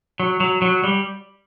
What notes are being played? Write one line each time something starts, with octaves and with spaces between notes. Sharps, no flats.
F#3
F#3
F#3
G3